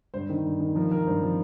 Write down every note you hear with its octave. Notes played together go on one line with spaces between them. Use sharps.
G2 C5
D#3
G2
D#3
F3 A#4
F3 A#4
G2 C5
F3